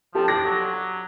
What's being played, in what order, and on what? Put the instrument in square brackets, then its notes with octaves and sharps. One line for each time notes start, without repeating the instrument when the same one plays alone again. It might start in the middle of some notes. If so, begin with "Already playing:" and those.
[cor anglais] F3 [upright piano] G4 A4
[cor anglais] D4 [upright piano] A#6
[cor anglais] F#3